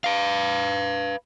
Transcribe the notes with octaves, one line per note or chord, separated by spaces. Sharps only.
B4 F5